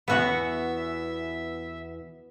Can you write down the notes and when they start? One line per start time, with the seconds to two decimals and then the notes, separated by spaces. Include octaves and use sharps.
0.08 E2 E3 B3 F#4 E5 F#5